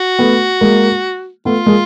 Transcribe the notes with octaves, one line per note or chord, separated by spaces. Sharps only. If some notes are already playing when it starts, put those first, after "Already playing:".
Already playing: F#4
A3 B3
G#3 A#3
A3 B3 F4
G#3 A#3